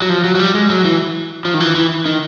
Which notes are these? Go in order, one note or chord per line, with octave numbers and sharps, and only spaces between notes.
F#3
F3
F#3
F#3
G3
G#3
F#3
E3
F3
D#3
E3
E3
D#3